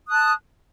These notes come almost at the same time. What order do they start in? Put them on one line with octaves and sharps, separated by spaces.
D#6 F#6 A5